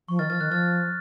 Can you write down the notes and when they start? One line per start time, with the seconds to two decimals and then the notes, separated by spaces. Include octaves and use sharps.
0.08 F3 C#6
0.19 D#3 F6 A6
0.30 F3 F6 A6
0.40 D#3 F#6
0.51 F3 F6 A6